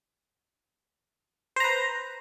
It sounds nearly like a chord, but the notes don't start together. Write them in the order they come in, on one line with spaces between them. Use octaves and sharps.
C5 A#5 B4